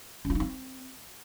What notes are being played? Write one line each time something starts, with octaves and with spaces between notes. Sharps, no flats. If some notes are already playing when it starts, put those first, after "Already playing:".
C#4
F4
D#4
C4